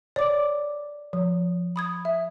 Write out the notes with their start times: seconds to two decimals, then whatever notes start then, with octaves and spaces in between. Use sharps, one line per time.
0.16 C#5 D5 D6
1.13 F3
1.76 B5 D#6 G#6
2.05 E5